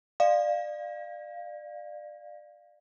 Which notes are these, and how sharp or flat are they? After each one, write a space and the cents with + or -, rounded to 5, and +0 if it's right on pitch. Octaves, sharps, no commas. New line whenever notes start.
D5 +25 F5 +0